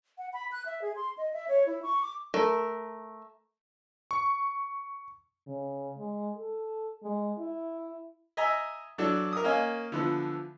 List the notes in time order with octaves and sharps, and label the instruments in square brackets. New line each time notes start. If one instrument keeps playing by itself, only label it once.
[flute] F#5
B5
F#6
E5
G#4
C6
D#5
E5
C#5
E4
C#6
D6
[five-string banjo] A3 A#4
[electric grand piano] C#6
[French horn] C#3
G#3
A4
G#3
E4
[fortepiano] D#5 E5 G#5 A#5
E3 F#3 D4 F#4 A4
A#4 D#6
A#3 C#4 D#5 F5 G#5
D3 E3 F3 B3